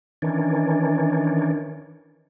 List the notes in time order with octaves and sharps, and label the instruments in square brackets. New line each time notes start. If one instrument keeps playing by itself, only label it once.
[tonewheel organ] D#3 E3 C#4 D4